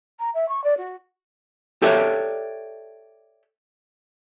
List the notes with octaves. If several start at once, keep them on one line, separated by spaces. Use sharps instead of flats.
A#5
E5
C#6
D5
F#4
G4 A4 C#5 D5 E5